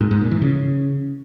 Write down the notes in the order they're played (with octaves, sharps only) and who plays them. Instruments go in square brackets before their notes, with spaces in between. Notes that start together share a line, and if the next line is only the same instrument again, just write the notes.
[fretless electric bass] G#2
G#2
A#2
E3
C#3